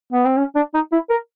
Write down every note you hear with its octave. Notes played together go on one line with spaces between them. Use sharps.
B3
C4
C#4
D4
D#4
E4
A#4